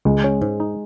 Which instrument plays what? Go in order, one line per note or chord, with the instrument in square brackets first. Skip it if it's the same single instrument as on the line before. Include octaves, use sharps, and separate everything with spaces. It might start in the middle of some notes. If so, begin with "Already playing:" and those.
[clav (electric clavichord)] C#2 [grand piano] G#3
[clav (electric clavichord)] C#4
G#2
D#4